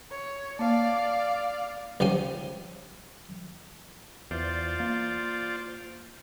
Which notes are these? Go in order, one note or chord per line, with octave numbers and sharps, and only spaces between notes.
C#5
A#3 D5 F5
C#2 F3 C#4 G4 G#5
E2 F4 C5 D5
A#3